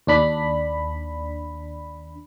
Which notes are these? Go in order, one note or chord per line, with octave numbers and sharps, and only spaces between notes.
D#2 D4 B5